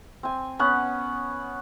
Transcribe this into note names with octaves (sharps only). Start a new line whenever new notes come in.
C4 G#5
B3 C#4 F#5